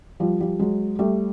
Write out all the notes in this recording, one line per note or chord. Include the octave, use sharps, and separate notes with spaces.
F3 G3
F3 G3
F#3 G#3
G3 A3